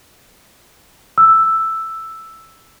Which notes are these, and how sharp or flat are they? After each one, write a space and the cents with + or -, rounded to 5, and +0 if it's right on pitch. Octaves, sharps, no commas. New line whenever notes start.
E6 +5